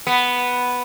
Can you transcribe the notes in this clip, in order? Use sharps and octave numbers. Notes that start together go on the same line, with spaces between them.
B3